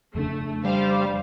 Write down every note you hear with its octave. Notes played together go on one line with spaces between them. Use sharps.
F2 C#3 A3 D4
G3 C5 F5